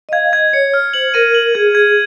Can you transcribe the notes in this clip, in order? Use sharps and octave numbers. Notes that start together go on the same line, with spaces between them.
D#5
F5 G#6
D#5 G#6
C#5 C#7
F6
C5 F#7
A#4 D#7
F#7
G#4 G#6
G#6